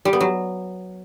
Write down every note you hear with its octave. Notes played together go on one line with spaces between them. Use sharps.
G3
B3
F#3